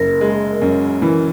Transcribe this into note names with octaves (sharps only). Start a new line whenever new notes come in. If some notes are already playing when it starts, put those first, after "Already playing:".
Already playing: F#1 A#4
G#3
F#2
E3